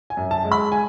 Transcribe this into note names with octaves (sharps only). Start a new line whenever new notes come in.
G#5
F#2
A5
G#3
B5
G#5